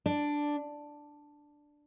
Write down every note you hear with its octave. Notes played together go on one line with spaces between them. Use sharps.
D4